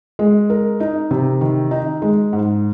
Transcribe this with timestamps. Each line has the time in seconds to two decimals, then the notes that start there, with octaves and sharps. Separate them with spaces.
0.19 G#3
0.50 A#4
0.80 D#4
1.11 C3
1.41 D#3
1.71 D#4
2.02 G#3
2.33 G#2